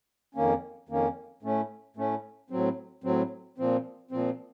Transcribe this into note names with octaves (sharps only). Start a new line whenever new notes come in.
F2 D#3 A#3 C#4
F2 D#3 A#3 C#4
A2 A3 C#4
A2 A3 C#4
A2 F#3 C4
A2 F#3 C4
A#2 F3 C4
A#2 F3 C4